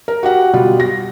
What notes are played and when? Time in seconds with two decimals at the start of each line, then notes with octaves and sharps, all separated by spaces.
0.08 A#4
0.23 F#4 G4 F#5
0.53 B2 G3 F4
0.80 A#6